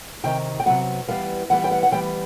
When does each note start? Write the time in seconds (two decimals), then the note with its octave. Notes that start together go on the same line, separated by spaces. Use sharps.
0.24 C3 D#3 G5
0.60 G5
0.66 C3 D#3 F#3 B3 F#5
1.08 E3 G3 B3 F5
1.50 E3 G3 B3 F#5
1.64 G5
1.71 F#5
1.83 F#5
1.92 E3 G3 B3 G5